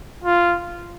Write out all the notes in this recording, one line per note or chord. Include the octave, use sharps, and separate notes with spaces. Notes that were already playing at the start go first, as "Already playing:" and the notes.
F4